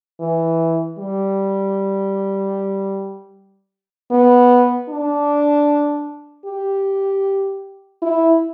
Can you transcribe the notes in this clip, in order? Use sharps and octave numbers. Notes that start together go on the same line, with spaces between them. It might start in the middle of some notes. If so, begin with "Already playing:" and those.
E3
G3
B3
D4
G4
E4